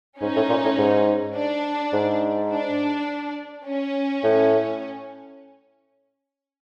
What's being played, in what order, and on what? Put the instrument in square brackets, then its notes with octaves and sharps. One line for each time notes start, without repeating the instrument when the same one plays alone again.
[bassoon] G#2 [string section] C#4 D#4
[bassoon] A2
A#2
A2
G#2
[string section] D4
[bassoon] G#2
[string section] D4
C#4
[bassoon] A2